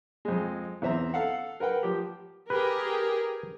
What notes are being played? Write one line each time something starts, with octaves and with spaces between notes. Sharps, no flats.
F2 G#3
E2 C4 E5 A#5
A4 F5 F#5
A#4 B4 F#5 G5
F3 G4
G4 G#4 A#4 B4